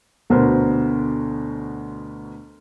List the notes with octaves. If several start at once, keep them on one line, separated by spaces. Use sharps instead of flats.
D2 B2 B3 A#4 C5